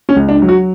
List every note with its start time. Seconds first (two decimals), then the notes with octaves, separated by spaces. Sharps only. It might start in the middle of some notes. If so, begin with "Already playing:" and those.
0.09 C#4
0.16 C#2
0.29 D4
0.42 F#3
0.49 F#4